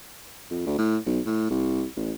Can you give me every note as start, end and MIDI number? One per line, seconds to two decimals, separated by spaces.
0.51 0.61 41
0.66 0.75 38
0.79 0.97 45
1.06 1.20 35
1.26 1.47 45
1.51 1.85 36
1.97 2.12 33